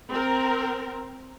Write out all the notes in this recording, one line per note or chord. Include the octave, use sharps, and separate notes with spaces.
C4 A#4